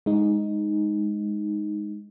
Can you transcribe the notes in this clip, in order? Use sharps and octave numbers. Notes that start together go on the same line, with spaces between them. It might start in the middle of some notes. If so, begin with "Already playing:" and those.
G#3 D#4